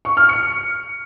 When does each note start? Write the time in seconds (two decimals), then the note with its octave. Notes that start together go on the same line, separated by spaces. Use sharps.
0.05 C#6
0.17 F6
0.29 C#7